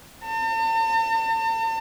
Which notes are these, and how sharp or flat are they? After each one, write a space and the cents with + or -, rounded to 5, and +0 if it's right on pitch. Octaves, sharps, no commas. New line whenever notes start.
A5 +45